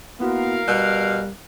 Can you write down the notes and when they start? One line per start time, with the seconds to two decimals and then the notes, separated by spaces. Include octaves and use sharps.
0.20 A#3 B3 E4 F#4 A#4 F5
0.68 B2 G3 F#6